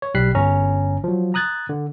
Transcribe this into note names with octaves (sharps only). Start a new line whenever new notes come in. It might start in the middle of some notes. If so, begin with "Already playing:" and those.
C#5
B1 G3 F#6 B6 C7
G1 C#4 A#5
F3 F#3
A#5 D#6 F#6 G#6 A6
D3